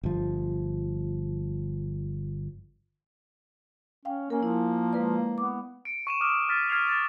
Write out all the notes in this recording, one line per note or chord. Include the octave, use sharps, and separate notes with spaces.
G1 F3
C#4 F5 G5
A#3 C#4 A#4 G#5
F3 E4
G#3 B4 D5
B3 D6
C#7 D7
C#6 D#7 E7
D6 D#6 F6 E7
F6 A6 B6
F6 G#6 C7 D#7 F7
A6 E7